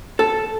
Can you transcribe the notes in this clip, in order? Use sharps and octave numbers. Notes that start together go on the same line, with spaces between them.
A4